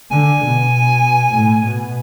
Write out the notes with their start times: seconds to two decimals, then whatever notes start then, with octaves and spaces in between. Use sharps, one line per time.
0.11 D3 G#5
0.41 B2
1.33 A2
1.64 B2